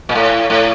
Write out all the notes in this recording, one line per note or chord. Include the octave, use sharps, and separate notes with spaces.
A#2
A2
A2